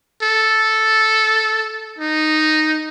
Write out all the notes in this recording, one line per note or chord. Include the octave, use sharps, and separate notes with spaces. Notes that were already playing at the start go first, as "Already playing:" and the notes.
A4
D#4